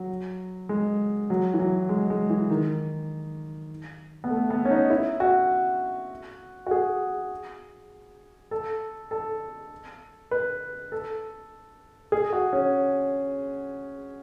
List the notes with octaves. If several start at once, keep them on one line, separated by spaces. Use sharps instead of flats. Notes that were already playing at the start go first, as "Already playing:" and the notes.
Already playing: F#3
G#3
F#3
E3
F#3
G#3
G#3
E3
D#3
B3
A3
B3
C#4
D#4
E4
F#4
F#4
G#4
A4
A4
B4
A4
G#4
F#4
C#4